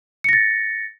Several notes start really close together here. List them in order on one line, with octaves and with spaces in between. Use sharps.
C#7 A#6 A6